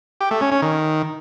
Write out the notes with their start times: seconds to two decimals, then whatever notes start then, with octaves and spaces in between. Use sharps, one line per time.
0.21 G4
0.31 A3
0.41 C#4
0.52 C#4
0.62 D#3